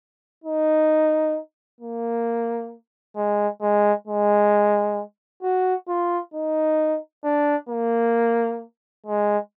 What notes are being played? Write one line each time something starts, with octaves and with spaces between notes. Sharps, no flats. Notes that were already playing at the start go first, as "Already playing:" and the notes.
D#4
A#3
G#3
G#3
G#3
F#4
F4
D#4
D4
A#3
G#3